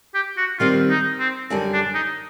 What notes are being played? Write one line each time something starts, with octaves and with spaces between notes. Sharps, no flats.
G4
F#4
D#3 G3 C4 F4
D#4
C4
F#2 D3 G3
D4
D#4